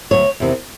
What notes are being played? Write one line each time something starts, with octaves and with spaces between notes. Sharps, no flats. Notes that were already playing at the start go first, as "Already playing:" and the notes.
D2 C#3 F#3 C#5
E2 C3 D#3